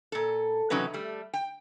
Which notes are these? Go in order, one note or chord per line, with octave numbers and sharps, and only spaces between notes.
A#2 A4
E2 C3 F#3 C#4 D#4 B4
G3 A3
G5